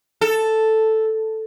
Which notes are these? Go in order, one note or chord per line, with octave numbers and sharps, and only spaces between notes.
A4